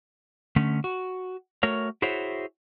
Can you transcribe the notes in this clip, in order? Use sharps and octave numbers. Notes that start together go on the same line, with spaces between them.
D3 A3 C#4
F#4
A3 F#4 A#4 C#5
E4 F#4 G#4 C5 C#5 E5